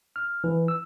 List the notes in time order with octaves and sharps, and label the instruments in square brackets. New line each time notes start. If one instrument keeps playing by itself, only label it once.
[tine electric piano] F6
E3
E6